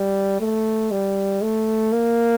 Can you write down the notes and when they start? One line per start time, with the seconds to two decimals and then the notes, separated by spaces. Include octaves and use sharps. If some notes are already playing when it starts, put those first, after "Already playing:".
Already playing: G3
0.40 A3
0.91 G3
1.42 A3
1.92 A#3